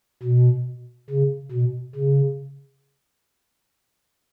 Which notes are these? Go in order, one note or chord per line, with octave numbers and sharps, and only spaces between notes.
B2
C#3
B2
C#3